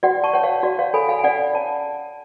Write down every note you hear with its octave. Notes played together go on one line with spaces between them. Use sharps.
F#4 D5 F#5
A5 C#6
C#5 F#5
C#5 F5
F#4 D5
C#5 F5
A4 G#5 B5
F5 G#5
G#5
C#4 D5 F#5
C#5 A5